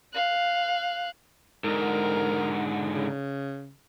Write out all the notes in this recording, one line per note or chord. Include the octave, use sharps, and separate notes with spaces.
F5 F#6
G#2 D3 A#4
C#3